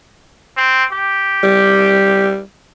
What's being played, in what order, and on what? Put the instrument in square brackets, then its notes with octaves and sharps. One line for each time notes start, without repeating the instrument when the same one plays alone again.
[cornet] C4
G4
[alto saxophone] G3